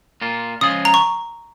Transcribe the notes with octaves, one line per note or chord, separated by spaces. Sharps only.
A#2 A#3 F4
C#3 F3 G#3 F4 G#4 D#6
A#5
C#6